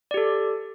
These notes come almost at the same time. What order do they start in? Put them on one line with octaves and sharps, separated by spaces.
D5 G4 A4